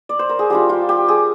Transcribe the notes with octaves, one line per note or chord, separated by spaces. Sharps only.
D5
C5
A#4
G#4
G3 D4 F4 G4
F4
G4
G#4